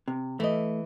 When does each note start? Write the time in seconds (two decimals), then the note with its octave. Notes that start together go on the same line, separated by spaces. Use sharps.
0.08 C3
0.40 E3 A3 D#5